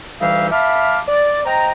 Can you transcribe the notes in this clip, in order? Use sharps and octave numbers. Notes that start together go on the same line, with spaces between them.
D2 E3 G3 D#4 E5 F5
E5 F5 A5 B5 D6 F6
D5
C5 D#5 G5 A#5